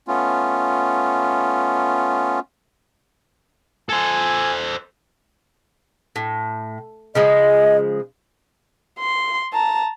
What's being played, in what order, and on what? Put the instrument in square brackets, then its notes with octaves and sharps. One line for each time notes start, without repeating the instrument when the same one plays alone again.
[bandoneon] A3 B3 C#4 F4
[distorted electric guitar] A4 C5 [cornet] G#5
[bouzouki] A2
[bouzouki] C#3 F3 G#3 [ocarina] D#5
[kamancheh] C6
A5 A#5